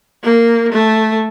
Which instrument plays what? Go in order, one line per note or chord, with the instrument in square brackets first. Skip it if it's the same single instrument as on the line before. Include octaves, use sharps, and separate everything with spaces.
[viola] A#3
A3